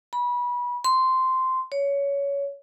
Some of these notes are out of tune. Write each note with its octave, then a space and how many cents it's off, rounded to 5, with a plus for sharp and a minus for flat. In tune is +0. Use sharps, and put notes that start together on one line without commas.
B5 -25
C6 -10
C#5 +20